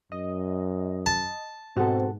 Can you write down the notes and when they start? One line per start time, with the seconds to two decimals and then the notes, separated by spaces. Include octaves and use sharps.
0.12 F#2 D#5
1.06 A5
1.77 G#2 B2 C4 F#4 A4